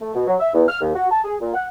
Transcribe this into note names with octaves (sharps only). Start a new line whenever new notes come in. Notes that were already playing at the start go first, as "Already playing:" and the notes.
A3
B2
F#3
E5
E2
F6
D#2
F#4
A5
G#4
A#2
F#5